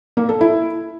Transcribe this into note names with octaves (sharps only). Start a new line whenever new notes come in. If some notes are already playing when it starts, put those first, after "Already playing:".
A#3
A4
E4